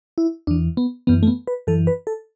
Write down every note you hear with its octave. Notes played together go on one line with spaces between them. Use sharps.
E4
E2 E3 D4
B3
F#2 E3 B3
A3
B3
B4
F#2 E3 A4
B4
A4